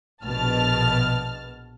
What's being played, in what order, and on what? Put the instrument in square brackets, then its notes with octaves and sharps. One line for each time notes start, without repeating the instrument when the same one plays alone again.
[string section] A#1 B2 A5 F6